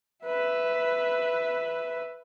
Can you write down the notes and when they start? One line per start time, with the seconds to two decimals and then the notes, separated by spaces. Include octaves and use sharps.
0.25 B4 E5